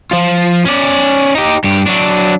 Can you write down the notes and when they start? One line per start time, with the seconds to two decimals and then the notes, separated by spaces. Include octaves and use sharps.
0.11 F3 F4
0.65 C#4 D5
1.35 D#4 G4
1.64 G2 G4
1.86 F#3 D4